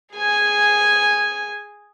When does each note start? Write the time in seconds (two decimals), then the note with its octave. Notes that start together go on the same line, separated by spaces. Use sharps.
0.14 G#4 G#5